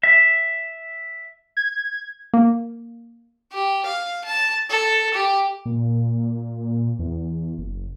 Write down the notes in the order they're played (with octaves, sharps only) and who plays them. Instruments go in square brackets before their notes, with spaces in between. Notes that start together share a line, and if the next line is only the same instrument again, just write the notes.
[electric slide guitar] E5
[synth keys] G#6
[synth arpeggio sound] A#3
[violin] G4
F5
A5
A4
G4
[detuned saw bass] A#2
E2
F#1